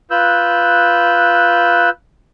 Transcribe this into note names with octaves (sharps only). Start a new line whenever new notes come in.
F4 B4 E6 F#6 G6